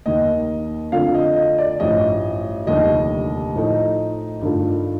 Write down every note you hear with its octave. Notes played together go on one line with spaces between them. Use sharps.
D#2 D#3 A#3 D#5
F2 D3 A3 D4 F4 F5
D#5
D#5
D5
A1 G2 F3 D#5
F1 D#2 D3 G3 D4 D#5
A2 F3 A3 D#4
G2 D#3 A3 D4 F4